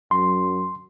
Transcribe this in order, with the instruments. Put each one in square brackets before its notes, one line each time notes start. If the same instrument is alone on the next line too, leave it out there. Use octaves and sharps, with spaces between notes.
[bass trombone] F#2 [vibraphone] F#3 [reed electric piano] C6